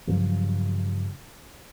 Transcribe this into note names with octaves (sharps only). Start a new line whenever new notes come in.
G2 C#3 F3 F#3